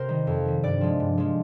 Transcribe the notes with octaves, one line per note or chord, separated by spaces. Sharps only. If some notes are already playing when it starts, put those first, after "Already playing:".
Already playing: C3 A#4 C5
D#3 G3
F2
D#3 G3
G2 D5
F3 G#3
G2
F3 G#3